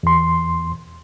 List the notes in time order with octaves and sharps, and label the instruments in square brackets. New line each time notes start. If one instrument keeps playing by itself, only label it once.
[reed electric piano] E2 C6